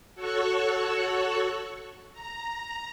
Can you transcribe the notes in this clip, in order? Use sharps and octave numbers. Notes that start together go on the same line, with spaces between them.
F#4 A4 C#5 C#6 E6 F#6
A#5